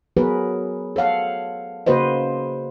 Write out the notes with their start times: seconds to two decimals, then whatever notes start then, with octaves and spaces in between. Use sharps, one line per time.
0.17 F#3 B3 F#4 G#4 A#4 B4
0.96 A4 C#5 F5 F#5
1.86 C#3 A#3 F#4 B4 C5 D#5